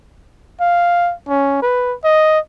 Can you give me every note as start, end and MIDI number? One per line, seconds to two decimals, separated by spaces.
0.61 1.13 77
1.28 1.59 61
1.62 1.94 71
2.04 2.39 75